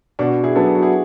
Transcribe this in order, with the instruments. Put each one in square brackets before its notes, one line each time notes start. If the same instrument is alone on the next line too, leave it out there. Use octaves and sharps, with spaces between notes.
[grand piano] B2 [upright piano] D4 F#4
[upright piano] E4 G#4
[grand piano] F#3 B3 D4 A4
[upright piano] G#4
F#4
E4 G#4